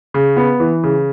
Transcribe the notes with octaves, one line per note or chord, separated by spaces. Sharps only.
C#3
B3
E3
C#3